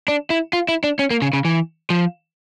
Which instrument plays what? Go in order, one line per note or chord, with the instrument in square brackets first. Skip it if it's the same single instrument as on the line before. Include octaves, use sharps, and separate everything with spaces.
[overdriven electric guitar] D4
E4
F4
E4
D4
C#4
A#3
C#3
C#3
E3
F3